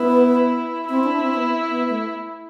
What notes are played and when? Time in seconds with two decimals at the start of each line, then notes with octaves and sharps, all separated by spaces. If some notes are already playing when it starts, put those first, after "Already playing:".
Already playing: B3 E4
0.89 C4 E4
1.04 D4
1.19 C4
1.34 B3
1.69 B3
1.89 A3